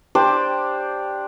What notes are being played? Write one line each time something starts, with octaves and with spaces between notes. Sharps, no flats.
D4 G4 C5 D5